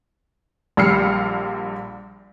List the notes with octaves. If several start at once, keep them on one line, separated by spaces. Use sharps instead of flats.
A#1 G3 E6 F6 C7 C#7